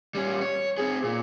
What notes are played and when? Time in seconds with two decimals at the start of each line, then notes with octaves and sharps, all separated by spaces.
0.15 G3 C#4
0.42 C#5
0.78 C4 G#4
1.04 A#2